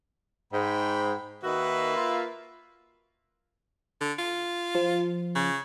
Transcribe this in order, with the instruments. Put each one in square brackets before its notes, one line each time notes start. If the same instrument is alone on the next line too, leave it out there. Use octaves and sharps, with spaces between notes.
[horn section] G#2 [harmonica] G5 B5
[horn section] D#3 D#4 F#4 [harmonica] A#3 B4 E5
[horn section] F4
[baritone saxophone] D3
F4
[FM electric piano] F3
[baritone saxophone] C#3